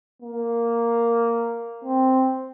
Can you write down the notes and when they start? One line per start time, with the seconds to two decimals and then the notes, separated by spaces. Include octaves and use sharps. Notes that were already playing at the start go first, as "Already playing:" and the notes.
0.22 A#3
1.85 C4